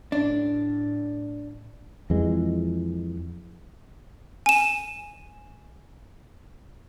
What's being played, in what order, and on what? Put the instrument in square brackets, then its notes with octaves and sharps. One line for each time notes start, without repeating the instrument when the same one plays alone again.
[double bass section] A2 [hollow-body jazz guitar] D4
[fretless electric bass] F2 E3 G#3
[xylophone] G#5 E7